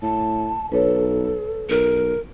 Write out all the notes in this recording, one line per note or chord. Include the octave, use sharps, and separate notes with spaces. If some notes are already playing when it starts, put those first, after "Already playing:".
A2 A5
B1 A4 B4 C#5
B1 A#4